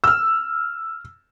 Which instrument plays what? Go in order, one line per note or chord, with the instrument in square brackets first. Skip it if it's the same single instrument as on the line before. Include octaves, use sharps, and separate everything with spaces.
[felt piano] E6 F6